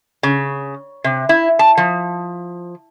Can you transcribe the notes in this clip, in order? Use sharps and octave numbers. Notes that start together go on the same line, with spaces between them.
C#3
C3
E4
A5
F3